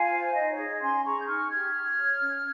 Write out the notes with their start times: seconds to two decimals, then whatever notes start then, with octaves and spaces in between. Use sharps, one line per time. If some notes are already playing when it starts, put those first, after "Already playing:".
Already playing: F4 F5 G#5
0.11 C5
0.34 D#4 D#5
0.49 C#5
0.57 G#4
0.65 D#5
0.81 C#4 G#5 C6
1.04 G#4 A#5 C#6
1.20 G6
1.27 D#4 C#6 F6
1.50 G4 F6 G#6
1.73 G4
1.97 C#5
2.20 C#4